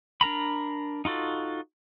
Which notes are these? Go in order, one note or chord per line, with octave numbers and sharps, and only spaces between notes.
D4 A#4 A#5 B5
D#4 F4 F#4 A4